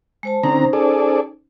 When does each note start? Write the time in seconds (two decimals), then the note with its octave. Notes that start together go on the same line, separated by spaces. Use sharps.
0.23 G#3 C5 A5
0.43 D3 C4 C#4 D#4 C5 A#5
0.73 G#4 A4 D5